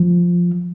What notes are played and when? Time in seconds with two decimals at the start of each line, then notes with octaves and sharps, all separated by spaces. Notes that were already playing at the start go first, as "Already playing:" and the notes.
Already playing: F3